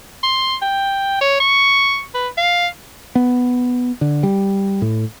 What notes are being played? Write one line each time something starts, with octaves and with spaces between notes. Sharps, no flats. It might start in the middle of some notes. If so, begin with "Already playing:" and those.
C6
G5
C#5
C#6
B4
F5
B3
D3
G3
A2